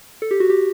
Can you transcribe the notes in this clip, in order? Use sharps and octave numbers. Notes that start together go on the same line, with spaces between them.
A4
G4
F#4
G4